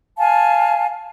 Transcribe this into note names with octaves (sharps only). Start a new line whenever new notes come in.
F5 G#5 A5